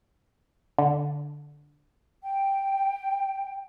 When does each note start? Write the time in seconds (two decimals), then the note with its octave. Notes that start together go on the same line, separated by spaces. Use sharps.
0.78 D3
2.22 G5